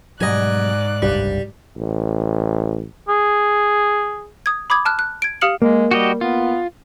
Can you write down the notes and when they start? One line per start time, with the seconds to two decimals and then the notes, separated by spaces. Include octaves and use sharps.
0.21 G#2 B2 F#3 G3 D5 D#5 G#5 F#6
1.02 F#1 C2 G2 G3
1.76 A1
3.09 G#4
4.46 D#6 G#6
4.70 B5 D6 D#6 G#6
4.85 A5 F6 F#6
4.99 F#6
5.22 G#6 D7
5.41 G4 F5 D#6 F6 C#7 F#7
5.62 G#3 A#3
5.91 G3 F#4 G4 D#5
6.21 B3 F4